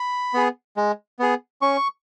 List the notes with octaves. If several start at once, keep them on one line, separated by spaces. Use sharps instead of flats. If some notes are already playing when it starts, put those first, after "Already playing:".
Already playing: B5
B3 G#4
G#3
B3 G#4
C#4 C#6